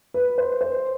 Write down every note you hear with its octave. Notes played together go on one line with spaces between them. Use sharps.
B4
C5
C5